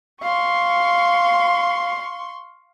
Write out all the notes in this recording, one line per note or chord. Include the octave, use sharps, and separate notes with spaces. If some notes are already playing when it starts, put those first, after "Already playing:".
F5 C6 C#6